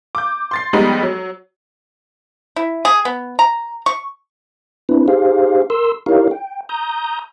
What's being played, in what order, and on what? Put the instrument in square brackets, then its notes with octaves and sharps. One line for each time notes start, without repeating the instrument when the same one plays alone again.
[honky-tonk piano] D6 G6
C6 A6 C7
F2 G3 G#3 B3 D#4
F#3
[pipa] E4
G#4
B3
A#5
C#6
[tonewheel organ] C4 D4 E4 B4
D#4 G4 G#4 C5 F5
A#4 C6 E6
D#4 E4 G4 A#4 C#5 F5
G5
A#5 D#6 G6